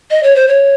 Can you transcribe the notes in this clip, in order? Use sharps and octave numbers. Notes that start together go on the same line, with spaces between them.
D#5
C#5
C5
C#5